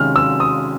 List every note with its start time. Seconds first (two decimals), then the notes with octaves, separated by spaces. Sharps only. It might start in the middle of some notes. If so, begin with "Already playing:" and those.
Already playing: C3 D#3 G#3 C#4 F6
0.16 E6
0.40 D#6